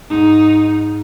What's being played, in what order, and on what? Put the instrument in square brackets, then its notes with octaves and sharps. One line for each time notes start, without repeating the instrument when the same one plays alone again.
[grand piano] G#2 [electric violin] D#4